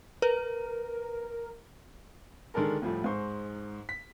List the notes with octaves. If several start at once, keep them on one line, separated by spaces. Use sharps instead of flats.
A#4 B4
D3 D#3 G#3 D4 A4 A#4
D2 A2 F3 G3 A3
G#2 G#3 D#4 C5 C6 C#6
B6